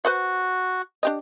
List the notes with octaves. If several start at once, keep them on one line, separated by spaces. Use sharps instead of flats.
F#4 B4 C5 F#5
D4 G4 D#5